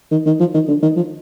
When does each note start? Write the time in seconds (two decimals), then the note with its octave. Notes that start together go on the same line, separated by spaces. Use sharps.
0.11 D#3
0.26 D#3
0.40 F3
0.54 D#3
0.68 D3
0.82 D#3
0.96 F3